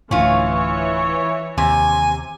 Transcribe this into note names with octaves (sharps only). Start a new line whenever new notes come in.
D1 A2 D3 E3 C#4 F4 C#5
D#2 C3 G#5